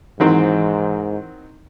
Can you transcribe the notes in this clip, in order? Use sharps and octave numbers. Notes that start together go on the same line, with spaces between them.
G#2 D#3 E3 F#3 C4 D#4 E4 C5